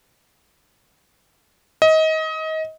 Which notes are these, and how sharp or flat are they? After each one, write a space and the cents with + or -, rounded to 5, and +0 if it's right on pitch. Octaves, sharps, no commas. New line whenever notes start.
D#5 +25